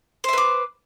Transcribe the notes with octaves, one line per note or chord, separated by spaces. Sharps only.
B4 C5 E5 D6